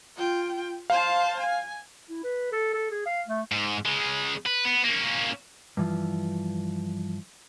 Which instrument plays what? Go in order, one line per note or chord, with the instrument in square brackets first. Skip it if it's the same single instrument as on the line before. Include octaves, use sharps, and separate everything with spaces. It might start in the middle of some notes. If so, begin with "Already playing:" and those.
[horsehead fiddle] F4 G5
[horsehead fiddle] C5 A5 [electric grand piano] F5
[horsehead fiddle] G#5
[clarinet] E4
B4
A4
A4
G#4
F5
A3
[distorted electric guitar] G#2
C#3 G#3
B4
B3
A#3 C#4
[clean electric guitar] G2 E3 F3